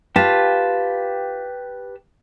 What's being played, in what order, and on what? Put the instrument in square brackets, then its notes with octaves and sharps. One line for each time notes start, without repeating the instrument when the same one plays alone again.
[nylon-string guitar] F4 [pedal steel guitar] G4 B4 A5